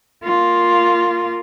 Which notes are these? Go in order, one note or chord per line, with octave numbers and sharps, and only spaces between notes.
A#3 F4